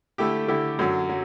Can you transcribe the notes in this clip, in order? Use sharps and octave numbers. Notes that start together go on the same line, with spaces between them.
D3 A3 E4 G4
D3 A3 E4 G4
F#2 D3 F#3
F#3